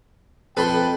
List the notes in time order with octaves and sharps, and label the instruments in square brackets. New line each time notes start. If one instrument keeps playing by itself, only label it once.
[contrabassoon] F2 [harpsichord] A4 C6 [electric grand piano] B4 B5 [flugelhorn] G5